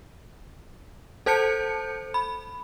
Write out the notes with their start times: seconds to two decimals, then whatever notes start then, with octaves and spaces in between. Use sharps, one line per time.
1.26 A4 C5 A5 G6 C#7
2.14 B5